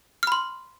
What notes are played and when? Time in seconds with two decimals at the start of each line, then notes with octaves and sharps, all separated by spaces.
0.23 F6
0.27 B5
0.32 C6